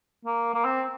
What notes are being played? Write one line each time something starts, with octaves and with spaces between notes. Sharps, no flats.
A#3
A#3
C4